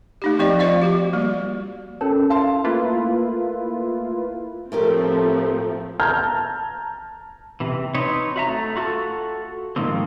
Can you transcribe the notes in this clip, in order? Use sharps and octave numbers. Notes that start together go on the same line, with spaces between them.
A3 D#4 G4
F3 C4 G4 D5 D#5
F4 C5 D5 D#5 F5
F#4 G4
G3 A#3
C#4 A4 A#4 C#5
F5 A5 C6
A3 A#3 E4 F4 B4
A2 F3 A3 C4 G4 A#4
A5 A#5 F6 G6 G#6
C3 E3
C4 D#4 B4 C#5
F#4 E5 A#5
A3
F4 F#4 A4
G#2 D#3 F3 A#3 C4